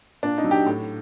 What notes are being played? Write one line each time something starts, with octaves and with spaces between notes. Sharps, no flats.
A#2 D4
D#4
F#3
G4
A2